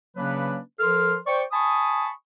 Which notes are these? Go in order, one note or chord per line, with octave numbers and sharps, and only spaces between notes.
C#3 F#3 A#3 C#4 D4 B4
F3 A4 A#4 C6 F6
C5 D5 G5 C#6
G#5 A5 B5 C#6 D#6